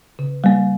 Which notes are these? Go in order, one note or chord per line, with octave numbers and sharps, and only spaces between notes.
C#3
G3 A#3